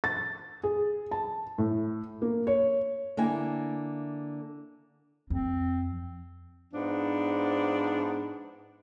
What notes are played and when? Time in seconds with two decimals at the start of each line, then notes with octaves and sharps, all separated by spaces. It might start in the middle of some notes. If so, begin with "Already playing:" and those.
0.04 A6
0.63 G#4
1.11 A5
1.58 A2
2.22 A#3
2.47 C#5
3.17 D3 A#3 E4 G#5
5.30 F2 C4
6.73 G#2 F3 B3 D4